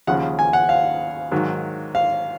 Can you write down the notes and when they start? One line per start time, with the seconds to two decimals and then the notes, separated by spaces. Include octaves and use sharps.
0.07 D#2 C#3 F3 F#5
0.39 G#5
0.53 F#5
0.69 F5
1.31 G#2 D#3 F#3
1.95 F5